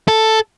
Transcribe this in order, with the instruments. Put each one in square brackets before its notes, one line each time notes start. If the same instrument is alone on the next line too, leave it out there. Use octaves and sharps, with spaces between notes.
[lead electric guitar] A4